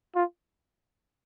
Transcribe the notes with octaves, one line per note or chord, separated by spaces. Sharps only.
F4